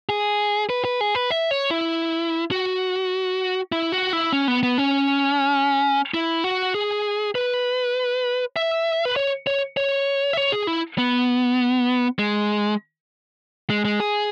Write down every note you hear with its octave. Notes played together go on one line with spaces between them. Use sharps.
G#4
B4
B4
G#4
B4
E5
C#5
E4
F#4
E4
F#4
E4
C#4
B3
B3
C#4
E4
F#4
G#4
B4
E5
B4
C#5
C#5
C#5
E5
C#5
G#4
E4
B3
G#3
G#3
G#3
G#4